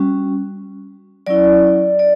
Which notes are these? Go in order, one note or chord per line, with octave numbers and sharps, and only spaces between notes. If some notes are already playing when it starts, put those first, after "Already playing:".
Already playing: G3 C#4 F#4
F#3 C#4 E4 D5
D5